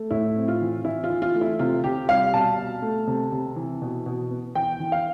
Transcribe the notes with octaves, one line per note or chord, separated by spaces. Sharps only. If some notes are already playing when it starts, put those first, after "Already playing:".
Already playing: A3
A2 E4
C4
F4
E3
E3 E4
F4
E3
F4
A3
E4
C3 F4
C3 G4
G3 F5
B2 A5
B2
A3
C3
C3
E3
B2
B2
B3
E3 G5
E3
F5